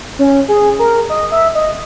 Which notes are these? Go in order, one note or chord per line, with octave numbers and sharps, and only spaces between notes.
C#4
G#4
A#4
D#5
E5
D#5